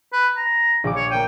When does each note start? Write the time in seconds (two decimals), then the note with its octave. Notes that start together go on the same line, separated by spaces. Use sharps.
0.12 B4
0.37 A#5
0.84 A#1 D6
0.96 C#5
1.11 A#3 G5 D#7